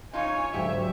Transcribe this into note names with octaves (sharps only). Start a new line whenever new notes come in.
D#4 F4 C#5 G#5
D2 G#2 F#3 G4 E5